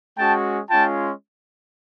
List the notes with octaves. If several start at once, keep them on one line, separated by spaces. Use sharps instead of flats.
G#3 C#4 F#4 G5 A5
G#3 C#4 F4 G5 A5